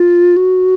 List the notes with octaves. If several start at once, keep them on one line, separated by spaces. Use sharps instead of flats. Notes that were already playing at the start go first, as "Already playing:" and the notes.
Already playing: F4
F#4